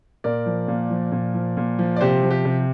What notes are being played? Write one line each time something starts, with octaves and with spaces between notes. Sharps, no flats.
A#2 A#4 D5
F3
A#2
F3
A#2
F3
A#2
F3
D5
C3 G4 C5
F3
G4
C3